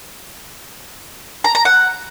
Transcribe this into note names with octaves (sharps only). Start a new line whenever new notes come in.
A#5
A#5
F#5